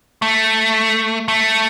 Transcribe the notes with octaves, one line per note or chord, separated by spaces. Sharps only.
A3
A3